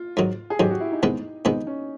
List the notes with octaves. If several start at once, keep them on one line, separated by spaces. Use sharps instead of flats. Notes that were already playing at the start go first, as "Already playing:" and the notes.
Already playing: F4
G#2 D#3 F#3
G#4
G#2 D#3 F#3 G4
F#4
E4
D#4
C3 D#3 G#3 B3
C3 D#3 G#3 B3 D#4
C#4